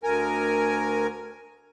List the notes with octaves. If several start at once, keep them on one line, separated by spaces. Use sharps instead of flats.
D2 A#4 G#5